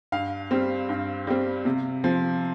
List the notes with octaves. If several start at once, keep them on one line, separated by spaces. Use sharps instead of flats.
G2 F5
G3 C4
G2
G3 C4
C3
F3 C4